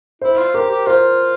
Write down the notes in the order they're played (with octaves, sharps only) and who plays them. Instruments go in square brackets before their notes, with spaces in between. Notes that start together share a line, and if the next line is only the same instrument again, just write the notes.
[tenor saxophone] E4 [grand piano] C5
[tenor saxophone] F4
[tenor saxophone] G4 [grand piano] A#4
[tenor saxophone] G4
[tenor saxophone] F4 [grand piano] C5